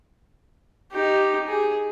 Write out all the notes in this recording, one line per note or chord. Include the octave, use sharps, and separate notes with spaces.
D#4 G4
G#4